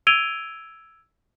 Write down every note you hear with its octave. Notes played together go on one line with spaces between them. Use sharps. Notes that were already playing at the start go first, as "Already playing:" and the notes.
E6 G#6 D7 D#7 F7 G7